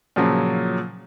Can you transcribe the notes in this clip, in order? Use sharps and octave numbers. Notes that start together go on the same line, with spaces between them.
A#2 C#3 F3 F#3